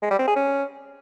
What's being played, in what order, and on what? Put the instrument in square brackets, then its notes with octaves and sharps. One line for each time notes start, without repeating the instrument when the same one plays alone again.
[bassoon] G#3
G3
C4
G#4
C#4